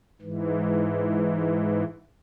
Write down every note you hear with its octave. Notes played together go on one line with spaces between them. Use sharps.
G#2 E3